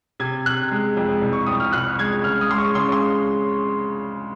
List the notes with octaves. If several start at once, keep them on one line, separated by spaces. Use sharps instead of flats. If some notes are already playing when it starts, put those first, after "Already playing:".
C3 G#6
C3 F#6
G#3
F2
C2
C#6
C2 D#6
F6
C2 F#6
G#3 G#6
C#3 F6
D#6
G#3 C6
C#6
C#3 C6
C6